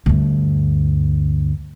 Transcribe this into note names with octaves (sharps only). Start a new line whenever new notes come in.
D2 G2